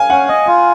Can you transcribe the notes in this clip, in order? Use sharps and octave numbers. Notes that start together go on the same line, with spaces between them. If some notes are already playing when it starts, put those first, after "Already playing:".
Already playing: F5 G#5
C#4 F#5
D#5
F4